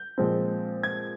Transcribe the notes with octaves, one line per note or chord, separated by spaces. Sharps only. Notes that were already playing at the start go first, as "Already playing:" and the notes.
Already playing: G6
A#2 F3 G#3 C4
G#6